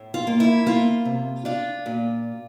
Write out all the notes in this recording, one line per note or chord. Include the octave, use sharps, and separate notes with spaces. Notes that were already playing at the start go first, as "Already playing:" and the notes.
Already playing: A2
F4
A#3
E4
A#3 F4
C3
D4 F4
A#2